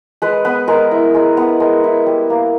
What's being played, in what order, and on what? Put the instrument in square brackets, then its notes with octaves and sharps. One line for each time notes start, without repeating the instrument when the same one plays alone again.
[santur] G#3 B4
B3 B4
G#3 A#4
E4
G#3
B3
G#3 A#4
E4
G3
A#3